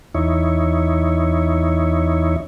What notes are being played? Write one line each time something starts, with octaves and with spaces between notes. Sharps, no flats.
E2 D#4 E4 C#5